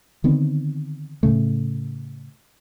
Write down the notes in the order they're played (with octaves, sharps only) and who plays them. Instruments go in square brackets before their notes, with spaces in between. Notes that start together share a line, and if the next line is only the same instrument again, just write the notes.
[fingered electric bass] D3 D#3 B3 C4
A2 C#3 A3